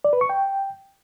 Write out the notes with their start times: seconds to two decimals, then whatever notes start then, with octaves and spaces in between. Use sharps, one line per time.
0.05 D5
0.13 B4
0.21 C#6
0.29 G5